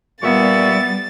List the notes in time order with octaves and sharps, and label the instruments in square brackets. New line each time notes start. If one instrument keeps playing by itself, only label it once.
[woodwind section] A#2 E5 C#6 [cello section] G3 [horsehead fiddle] B3 [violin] A6